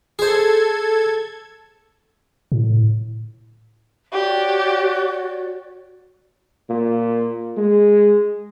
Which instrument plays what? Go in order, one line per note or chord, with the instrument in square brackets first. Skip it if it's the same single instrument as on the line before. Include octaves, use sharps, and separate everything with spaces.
[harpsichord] G#4 C5 [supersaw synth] A4 G#6
[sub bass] A2
[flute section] F#4 C#5 D5 [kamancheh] G4
[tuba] A#2
G#3